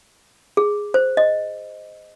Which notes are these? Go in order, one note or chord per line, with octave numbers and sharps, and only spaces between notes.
G#4
C5
D#5